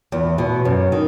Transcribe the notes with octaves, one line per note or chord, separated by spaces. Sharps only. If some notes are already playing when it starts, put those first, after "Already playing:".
E2
B2
F#2
D#3